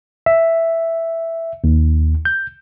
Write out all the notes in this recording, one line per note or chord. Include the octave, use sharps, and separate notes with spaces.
E5
D#2
G6